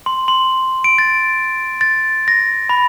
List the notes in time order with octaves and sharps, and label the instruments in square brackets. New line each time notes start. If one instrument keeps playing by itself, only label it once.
[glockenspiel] C6
C6
D7
A6
A6
A#6
B5